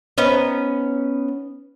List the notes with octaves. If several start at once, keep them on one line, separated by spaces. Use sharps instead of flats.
B3 C#4 D#4